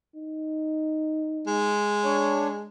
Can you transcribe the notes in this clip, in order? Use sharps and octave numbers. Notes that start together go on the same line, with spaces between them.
D#4
G#3
D4 C#5